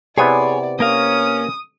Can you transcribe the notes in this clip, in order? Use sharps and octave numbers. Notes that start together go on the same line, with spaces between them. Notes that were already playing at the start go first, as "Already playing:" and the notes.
C3 B3 E4 G#4 C#5 D5 G#5
A#3 C#4 A#4 F5 D#6